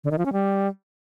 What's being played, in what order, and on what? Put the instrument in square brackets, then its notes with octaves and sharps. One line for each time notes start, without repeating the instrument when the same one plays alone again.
[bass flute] D3
D#3
F3
C#4
G3